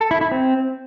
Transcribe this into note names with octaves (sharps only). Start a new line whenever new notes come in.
A4
E4
E4
C4